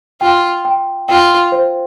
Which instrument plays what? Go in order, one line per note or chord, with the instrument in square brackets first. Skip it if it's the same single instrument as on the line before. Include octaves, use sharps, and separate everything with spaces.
[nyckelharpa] F4 [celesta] G5
[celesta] G5
[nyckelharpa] F4 [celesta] G5
[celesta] C5